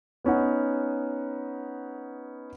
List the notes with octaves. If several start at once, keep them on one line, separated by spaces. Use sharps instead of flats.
B3 C#4 D#4 F#5